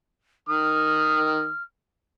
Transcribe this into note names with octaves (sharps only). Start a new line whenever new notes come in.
D#3 D#6 F6